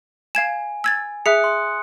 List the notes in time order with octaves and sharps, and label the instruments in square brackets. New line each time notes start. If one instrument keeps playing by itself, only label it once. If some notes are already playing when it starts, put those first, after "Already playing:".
[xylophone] F5 G#6 E7 [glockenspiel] G#5
[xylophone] E6 G#6 A6
[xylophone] G#4 E5 [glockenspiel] D#6 F#6 C#7
[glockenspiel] C6